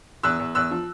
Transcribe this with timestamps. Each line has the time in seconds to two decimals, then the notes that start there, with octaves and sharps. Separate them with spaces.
0.23 E2 E6 F#6
0.39 E2
0.55 E2 E6 F#6
0.71 F3